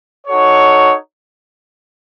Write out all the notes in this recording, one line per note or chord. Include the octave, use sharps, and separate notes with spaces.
D#4 F#4 A4 C#5